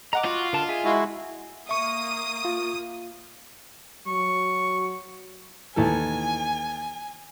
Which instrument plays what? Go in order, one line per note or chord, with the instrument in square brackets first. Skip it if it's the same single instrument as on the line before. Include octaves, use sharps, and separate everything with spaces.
[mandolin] D#5 F#5 D6 [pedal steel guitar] A#5
[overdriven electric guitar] F4 [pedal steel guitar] F#4
[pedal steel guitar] D3 A#4 A5
G#4 E5 G#5
[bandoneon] G#3 E4 F#4
[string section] A#3 D#6 [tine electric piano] E5 C#6
[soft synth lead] F4
[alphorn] F#3 [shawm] C#6
[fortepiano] D#2 E3 A4 [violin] G#5